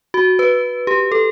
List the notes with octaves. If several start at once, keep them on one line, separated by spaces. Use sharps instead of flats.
F#4
B4
G4
A4